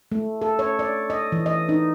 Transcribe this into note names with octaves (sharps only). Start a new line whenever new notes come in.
A3
A4
C#5
D5
D#5
E3
D#5
D#4